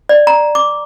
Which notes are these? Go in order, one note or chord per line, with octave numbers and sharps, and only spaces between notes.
D5
A#5
D6